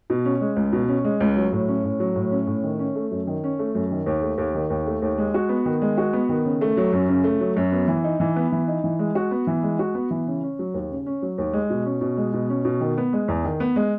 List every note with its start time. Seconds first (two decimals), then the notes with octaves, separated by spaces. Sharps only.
0.10 B2
0.25 C#4
0.41 G#3
0.56 C#2
0.73 B2
0.88 C#4
1.04 G#3
1.20 C#2
1.36 F#3
1.52 A2
1.68 C#4
1.84 A2
2.00 F#3
2.16 A2
2.31 C#4
2.47 A2
2.64 D#3
2.79 C#4
2.96 A3
3.11 F#2
3.27 D#3
3.44 C#4
3.59 A3
3.75 F#2
3.91 D#3
4.06 D#2
4.22 A3
4.38 D#2
4.55 D#3
4.70 D#2
4.87 A3
5.02 D#2
5.18 G#3
5.34 F#4
5.49 B3
5.65 D#3
5.82 G#3
5.98 F#4
6.13 B3
6.29 D#3
6.45 C#3
6.61 A3
6.77 F#3
6.93 F#2
7.09 C#3
7.24 A3
7.40 F#3
7.57 F#2
7.72 B3
7.88 E3
8.04 D#4
8.20 E3
8.36 B3
8.52 E3
8.68 D#4
8.84 E3
8.99 G#3
9.15 F#4
9.31 B3
9.47 E3
9.63 G#3
9.79 F#4
9.95 B3
10.11 E3
10.27 C#3
10.43 C#4
10.59 F#3
10.74 D#2
10.91 C#3
11.06 C#4
11.22 F#3
11.38 D#2
11.53 G#3
11.70 B2
11.85 C#4
12.01 B2
12.17 G#3
12.34 B2
12.49 C#4
12.65 B2
12.81 D#3
12.98 B3
13.13 G#3
13.28 E2
13.45 D#3
13.60 B3
13.76 G#3